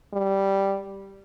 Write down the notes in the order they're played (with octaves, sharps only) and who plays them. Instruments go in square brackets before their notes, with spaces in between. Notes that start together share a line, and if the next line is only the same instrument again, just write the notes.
[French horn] G3